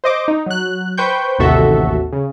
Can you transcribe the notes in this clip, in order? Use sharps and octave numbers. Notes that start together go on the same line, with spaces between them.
C5 D#5 D6
D#4
F#3 F#6
B4 C5 G5 C#6 G6
A1 D#2 C3 F#4 A4 E5
C#3